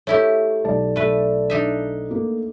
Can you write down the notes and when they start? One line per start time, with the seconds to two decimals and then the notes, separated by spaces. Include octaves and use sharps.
0.07 A3 E4 G4 C#5
0.65 B1 D5 A5
0.96 A3 B4
1.50 D4 D#4 E5
2.10 A3 A#3